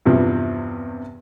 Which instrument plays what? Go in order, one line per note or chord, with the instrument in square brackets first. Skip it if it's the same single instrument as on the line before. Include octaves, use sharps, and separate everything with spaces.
[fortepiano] E2 G2 C3 F3